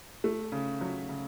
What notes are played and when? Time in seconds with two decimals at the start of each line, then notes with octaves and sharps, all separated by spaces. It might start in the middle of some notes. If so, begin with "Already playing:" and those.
0.24 A3
0.52 C#3
0.81 F#3
1.09 C#3